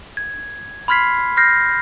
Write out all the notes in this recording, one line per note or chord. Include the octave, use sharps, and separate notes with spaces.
G#6
B5 C6 F6 G#6 B6 C7
F6 G6 A#6 C7